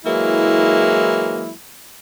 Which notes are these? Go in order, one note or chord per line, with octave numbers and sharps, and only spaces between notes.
E3 F#3 G#3 A#3 E4